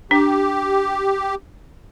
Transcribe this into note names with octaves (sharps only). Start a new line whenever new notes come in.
D4 G4